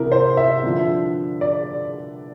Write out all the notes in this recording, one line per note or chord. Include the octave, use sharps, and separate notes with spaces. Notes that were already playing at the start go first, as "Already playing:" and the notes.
Already playing: C2 C3 E3 E4 A#4
C5
E5
G2 D3 F3
D5